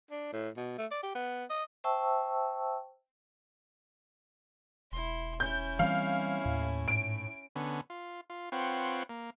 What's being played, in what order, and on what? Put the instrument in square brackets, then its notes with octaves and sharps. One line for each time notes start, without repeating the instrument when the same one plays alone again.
[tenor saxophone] D4
A2
B2
A3
D5
G4
B3
D#5
[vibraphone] C5 E5 G5 A5 C#6 E6
[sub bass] E1 [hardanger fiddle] E4 C6
[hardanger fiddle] C#4 E4 [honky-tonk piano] G6
[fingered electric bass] E3 G3 C4 [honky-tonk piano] F5
[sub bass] D#2 [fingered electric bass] A2
[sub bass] G#2 [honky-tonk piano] D7
[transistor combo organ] D3 B3 C#4
F4
F4
C4 F4 B4 C#5 F#5 G5
A#3